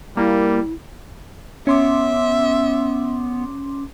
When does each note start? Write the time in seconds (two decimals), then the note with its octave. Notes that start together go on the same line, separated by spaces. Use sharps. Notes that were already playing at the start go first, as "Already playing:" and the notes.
0.17 G3 A#3 E4
1.67 B3 C#4 E5 C6 D6